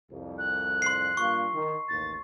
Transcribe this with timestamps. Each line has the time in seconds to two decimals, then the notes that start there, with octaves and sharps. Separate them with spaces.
0.10 C2 F2
0.38 F#6
0.82 C6 C7
1.17 G2 A#3 F4 C#6
1.53 D#3
1.89 A1 D#2 A6